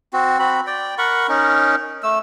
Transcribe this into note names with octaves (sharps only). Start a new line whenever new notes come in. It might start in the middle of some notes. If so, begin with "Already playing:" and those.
C4 F#4
C4 F#4 B5
D5 G5
A#4 F#5 B5 C#6
C#4 D#4 A#4
A3 E6